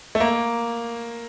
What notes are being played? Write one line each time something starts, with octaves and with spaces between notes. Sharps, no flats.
A3
A#3